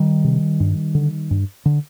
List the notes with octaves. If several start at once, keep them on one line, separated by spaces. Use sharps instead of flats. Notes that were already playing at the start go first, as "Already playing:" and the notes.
Already playing: D#3 G3
C3
G2
D3
G2
D3